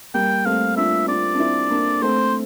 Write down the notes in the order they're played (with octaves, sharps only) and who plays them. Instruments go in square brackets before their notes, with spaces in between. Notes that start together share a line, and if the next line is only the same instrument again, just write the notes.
[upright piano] G3 A#3 [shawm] G5
[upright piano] A3 C4 [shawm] F5
[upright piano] D4 F4 [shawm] E5
[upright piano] D4 F4 [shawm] D5
[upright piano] D4
C4 E4
A#3 D4
[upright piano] A3 C4 [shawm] C5